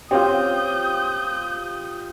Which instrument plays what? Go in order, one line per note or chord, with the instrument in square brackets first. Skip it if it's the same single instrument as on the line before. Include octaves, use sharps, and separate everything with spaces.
[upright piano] C4 C#4 [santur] F4 G4 [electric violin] D#6 G6